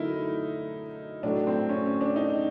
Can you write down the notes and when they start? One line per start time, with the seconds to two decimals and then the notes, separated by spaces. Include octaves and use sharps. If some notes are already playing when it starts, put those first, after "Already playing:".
Already playing: D3 F#3 A3 D#4 E4 A#4
1.23 A2 F#3 A3 D4
1.47 C4
1.69 C#4
1.86 C#4
2.01 D4
2.16 D#4